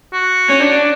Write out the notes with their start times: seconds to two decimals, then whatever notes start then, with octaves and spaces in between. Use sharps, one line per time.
0.13 F#4
0.49 C#4
0.60 D4